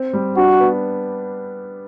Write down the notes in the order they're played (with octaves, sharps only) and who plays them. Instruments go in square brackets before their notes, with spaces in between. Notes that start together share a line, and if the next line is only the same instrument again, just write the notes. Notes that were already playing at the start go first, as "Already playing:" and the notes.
Already playing: [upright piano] C4
G3
[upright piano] D4 [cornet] F#4
[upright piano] B3